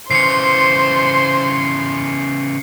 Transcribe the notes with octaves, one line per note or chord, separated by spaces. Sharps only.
C#3 E3 C5 C6 C7 C#7